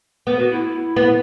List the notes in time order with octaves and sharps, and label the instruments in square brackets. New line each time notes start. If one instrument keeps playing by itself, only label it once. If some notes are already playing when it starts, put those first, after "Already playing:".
[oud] B3 [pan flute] B4
[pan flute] F#4
E4
[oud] B3